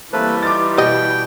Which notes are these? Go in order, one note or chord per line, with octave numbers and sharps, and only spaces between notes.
E3 G3 A3 A#3 C4 A4 B4
D#4 F4 D6 A6
B2 G4 D#5 G5